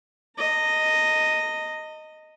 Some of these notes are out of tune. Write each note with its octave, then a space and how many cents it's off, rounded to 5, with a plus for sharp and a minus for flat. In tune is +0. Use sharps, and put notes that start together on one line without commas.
D#5 +0 A#5 -45